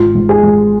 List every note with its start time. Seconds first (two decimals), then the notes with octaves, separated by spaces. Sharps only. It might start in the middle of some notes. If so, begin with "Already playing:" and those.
Already playing: G#1 F4
0.15 G#2
0.29 G#4
0.43 G#1